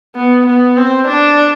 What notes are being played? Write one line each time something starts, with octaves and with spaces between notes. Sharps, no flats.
B3
B3
C4
D4